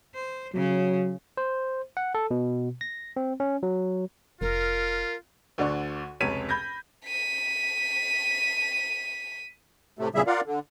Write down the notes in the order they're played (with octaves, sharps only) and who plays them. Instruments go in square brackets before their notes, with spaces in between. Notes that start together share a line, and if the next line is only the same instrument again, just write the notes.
[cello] C5
[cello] C#3 [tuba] F#3
[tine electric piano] C5
F#5
A4
B2
A#6
C4
C#4
F#3
[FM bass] F1 [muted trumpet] F4 [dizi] A#4
[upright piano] D2 D3 D4 D5 C#6
F1 C#2 C3 C#5 B6 D#7
B5 G6 G#6 A#6
[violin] B6 D#7
[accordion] A2 C3 A3
E2 A#2 C#3 G3 G#4 E5
F4 A#4 D5 F5 F#5
D3